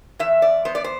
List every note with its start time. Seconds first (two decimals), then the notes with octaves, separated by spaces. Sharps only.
0.19 E2 E5
0.42 D5
0.65 B3 C5
0.75 D5
0.84 C5